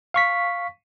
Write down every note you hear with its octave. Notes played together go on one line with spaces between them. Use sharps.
F5 C#6 B6